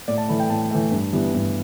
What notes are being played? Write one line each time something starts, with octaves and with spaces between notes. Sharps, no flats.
A2 D5
A5
E3 A3 B5
G5
A2 A5
E3 A3
G2
E3 G3 B3
G2